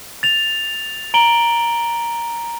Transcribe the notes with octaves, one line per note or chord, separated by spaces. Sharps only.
A6 F7
A#5 D7 F#7 G7